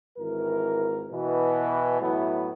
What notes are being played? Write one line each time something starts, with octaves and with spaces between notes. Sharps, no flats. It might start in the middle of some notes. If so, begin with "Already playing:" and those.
G#1 E3 A#4
B2 E3
A2 F#3 B3 E4